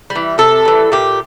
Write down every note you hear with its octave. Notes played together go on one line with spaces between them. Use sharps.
G3
E3
C3 A4
E3 G3
A#2 G4